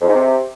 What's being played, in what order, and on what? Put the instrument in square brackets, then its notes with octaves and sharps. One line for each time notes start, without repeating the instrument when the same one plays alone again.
[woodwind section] F2
G#2
C3